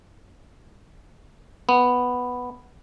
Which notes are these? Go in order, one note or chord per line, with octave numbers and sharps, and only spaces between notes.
B3